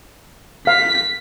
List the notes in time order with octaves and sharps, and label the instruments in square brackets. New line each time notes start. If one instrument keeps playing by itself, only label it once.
[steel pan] F5 [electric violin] B6